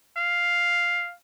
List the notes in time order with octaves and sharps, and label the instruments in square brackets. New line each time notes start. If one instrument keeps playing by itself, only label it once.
[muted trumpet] F5